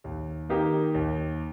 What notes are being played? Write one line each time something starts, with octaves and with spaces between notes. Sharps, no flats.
D#2
D#3 A#3 D#4 G4
D#2